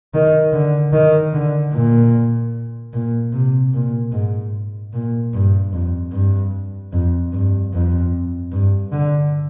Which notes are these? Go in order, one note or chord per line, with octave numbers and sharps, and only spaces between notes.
D#3
D3
D#3
D3
A#2
A#2
C3
A#2
G#2
A#2
G2
F2
G2
F2
G2
F2
G2
D3